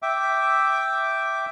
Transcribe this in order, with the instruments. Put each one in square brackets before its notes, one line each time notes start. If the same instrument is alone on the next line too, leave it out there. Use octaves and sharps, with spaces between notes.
[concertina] E5 G5 D6